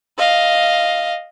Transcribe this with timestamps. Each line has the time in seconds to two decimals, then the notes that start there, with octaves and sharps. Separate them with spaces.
0.18 D#5 F5